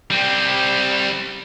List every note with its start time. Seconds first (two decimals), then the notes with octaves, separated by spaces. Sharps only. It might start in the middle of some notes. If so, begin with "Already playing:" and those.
0.10 G3 C4